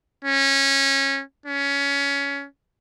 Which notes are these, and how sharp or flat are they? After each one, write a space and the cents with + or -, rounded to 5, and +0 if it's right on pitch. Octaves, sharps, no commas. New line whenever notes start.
C#4 -20
C#4 +20